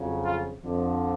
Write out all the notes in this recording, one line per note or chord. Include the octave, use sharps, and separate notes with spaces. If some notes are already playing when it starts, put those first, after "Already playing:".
Already playing: F2 C#3 F#3
F4
F2 D3 F3